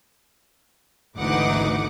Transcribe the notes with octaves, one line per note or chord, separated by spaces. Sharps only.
G#1 D2 E3 D#4 F#5 D6